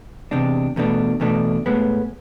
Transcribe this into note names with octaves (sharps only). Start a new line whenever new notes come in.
E2 C3 G#3 D4
E2 B2 A3 D4
E2 B2 A3 D4
A2 G#3 B3